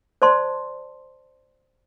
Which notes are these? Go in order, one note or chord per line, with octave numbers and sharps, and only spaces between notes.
C5 D5 A5 C6